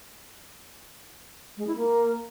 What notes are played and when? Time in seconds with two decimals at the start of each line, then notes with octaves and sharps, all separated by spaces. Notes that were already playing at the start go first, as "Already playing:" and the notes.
1.57 G#3
1.67 E4
1.77 A#3